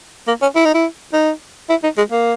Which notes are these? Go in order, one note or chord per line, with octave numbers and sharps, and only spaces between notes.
A#3
C#4
E4
D#4
E4
D#4
E4
D#4
G#3
A#3